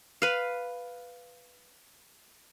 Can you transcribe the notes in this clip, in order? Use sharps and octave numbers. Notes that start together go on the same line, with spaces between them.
B4 F5